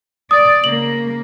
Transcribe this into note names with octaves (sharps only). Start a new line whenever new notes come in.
D5 D#6
C#3 A#3 F#7